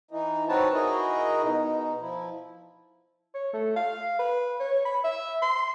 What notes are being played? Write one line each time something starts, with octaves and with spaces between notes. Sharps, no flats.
E3 D#4
C4 D#4 F#4 B4 C#5 A5
D#4 E4 F#4 G#4 A#4 D#5
B2 D#4
F3 E4
C#5
A3
F5
B4
C#5
B5
E5
C6